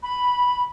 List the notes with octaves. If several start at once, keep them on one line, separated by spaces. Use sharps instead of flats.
B5